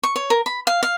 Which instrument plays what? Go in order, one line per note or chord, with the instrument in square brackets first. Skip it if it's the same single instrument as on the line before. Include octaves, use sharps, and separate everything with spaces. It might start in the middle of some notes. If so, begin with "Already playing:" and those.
[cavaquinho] C#6
C#5
A#4
B5
F5
F5